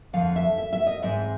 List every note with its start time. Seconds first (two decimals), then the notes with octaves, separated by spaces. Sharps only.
0.13 F2 D3 F3 F5
0.36 E5
0.58 E5
0.73 E5
0.87 D#5
1.02 G#2 E3 G#3 C4 E5